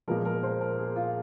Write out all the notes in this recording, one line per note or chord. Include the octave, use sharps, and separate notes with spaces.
A#2 F3 G#3 A#4
A#4
C5
A#4
G#4
F4